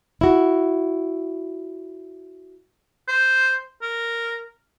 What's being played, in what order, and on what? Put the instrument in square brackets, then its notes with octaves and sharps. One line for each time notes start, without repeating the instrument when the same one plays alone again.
[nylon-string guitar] E4 F#4
[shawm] C5
A#4